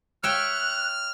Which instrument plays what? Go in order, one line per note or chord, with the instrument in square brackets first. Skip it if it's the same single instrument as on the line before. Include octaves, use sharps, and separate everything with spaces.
[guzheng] C#5 E5 G5 [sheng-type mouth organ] F6 [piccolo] F#6